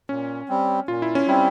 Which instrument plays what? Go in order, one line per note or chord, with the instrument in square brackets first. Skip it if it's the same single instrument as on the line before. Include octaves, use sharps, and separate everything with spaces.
[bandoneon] A#2 [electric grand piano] C#4
[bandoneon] G3 C4
[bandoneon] A#2 [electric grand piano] F4
[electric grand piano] E4
C#4
[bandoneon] G3 C4 [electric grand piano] E4